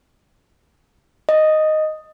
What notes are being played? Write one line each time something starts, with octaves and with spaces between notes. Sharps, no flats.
D#5